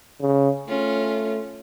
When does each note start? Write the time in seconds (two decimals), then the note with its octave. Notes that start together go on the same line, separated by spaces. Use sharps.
0.21 C#3
0.68 A3 C#4 F4